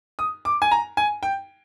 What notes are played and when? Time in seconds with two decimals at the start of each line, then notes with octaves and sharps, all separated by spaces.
0.19 D#6
0.45 D6
0.62 G#5
0.71 A#5
0.97 G#5
1.23 G5